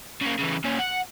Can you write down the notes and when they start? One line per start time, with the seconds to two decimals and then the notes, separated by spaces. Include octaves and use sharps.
0.21 C#3 A#3
0.39 C#3 E3
0.64 A#2 C#4
0.79 F#5